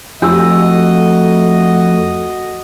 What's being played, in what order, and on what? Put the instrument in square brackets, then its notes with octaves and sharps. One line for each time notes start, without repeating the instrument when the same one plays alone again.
[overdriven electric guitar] F2 [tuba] A3 [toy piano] D4 G4 E6 [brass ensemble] F#4 D#5